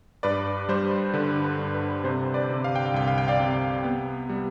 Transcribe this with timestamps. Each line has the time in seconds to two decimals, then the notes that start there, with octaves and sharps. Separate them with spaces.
0.23 G2 B4 D5
0.69 G3 C5
1.14 D3 B4
1.44 B4
1.59 G2
1.74 B4
2.04 C3 C5
2.34 B4 D5
2.49 C3
2.64 F5
2.75 G5
2.86 F5
2.94 C2 G5
3.08 F5
3.18 G5
3.28 D5 F5
3.40 C3
3.84 B3
4.29 G3